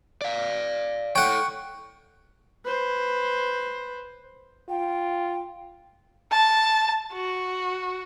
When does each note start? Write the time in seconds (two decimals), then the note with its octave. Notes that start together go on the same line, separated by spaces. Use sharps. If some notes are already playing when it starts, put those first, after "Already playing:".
0.21 D5 F5
1.15 A4 C#5 F#5 G5 C#6
2.65 B4 C5
4.69 F4 G5
6.32 A5
7.13 F#4